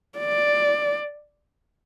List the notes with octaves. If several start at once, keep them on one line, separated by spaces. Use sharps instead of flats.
D5